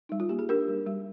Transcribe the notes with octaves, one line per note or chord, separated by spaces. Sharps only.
G3 D#4
F4
A#3 G4
G#4
D4 G4 A#4
G3
G3